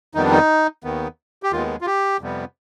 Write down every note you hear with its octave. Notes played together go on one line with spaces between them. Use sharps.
F2 D#3 G3 B3 D#4
D4
D#4
D#2 D#3 B3
G4
D#2 D#3 G#3 B3 F4
F4
G4
F2 C3 G3 B3